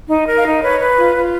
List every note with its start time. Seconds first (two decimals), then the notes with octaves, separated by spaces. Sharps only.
0.08 D#4
0.27 A#4
0.38 F5
0.45 D#4
0.62 B4 C#5
0.79 B4
0.97 F4
1.15 F4